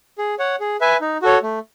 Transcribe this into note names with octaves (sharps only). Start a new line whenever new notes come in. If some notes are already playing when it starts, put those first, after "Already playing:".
G#4
C#5 F#5
G#4
B4 E5 G#5
D#4
F#4 A4 C#5
A3